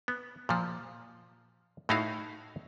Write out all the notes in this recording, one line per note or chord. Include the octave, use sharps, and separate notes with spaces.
B3
A#2 F3
A2 A3 D#4 E4 F#4 F5